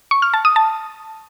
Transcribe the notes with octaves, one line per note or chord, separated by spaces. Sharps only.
C#6
F6
A5
D#6
A5